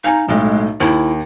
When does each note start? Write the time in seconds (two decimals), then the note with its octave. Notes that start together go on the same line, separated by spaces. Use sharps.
0.04 D#4 F5 G#5 A#5
0.28 B1 A2 G#3
0.80 D#2 E4